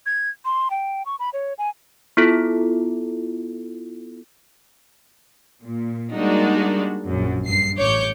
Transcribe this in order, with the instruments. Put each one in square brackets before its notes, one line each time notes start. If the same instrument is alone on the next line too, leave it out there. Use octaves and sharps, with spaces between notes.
[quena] G#6
C6
G5
C#6
B5
C#5
G#5
[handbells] B3 E4 F4 A4
[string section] A#2
G3 G#3 A#3 D4 D#4 F#4
A#1 F#2
G2 C7
A1 C#5 D6 G6 C#7